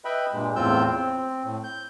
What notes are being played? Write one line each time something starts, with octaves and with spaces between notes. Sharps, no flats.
B4 D#5 E5 G5 B5
G2 A#2 G#3
E2 A2 C4 F4 E6 G6
C4
A2
G6